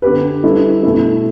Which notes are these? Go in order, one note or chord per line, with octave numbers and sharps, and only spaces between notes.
D3 B3 G4 B4
G3 E4 A4
B2 A3 E4